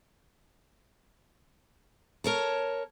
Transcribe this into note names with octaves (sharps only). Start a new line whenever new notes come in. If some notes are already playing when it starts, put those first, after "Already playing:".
A#4 C#5 A5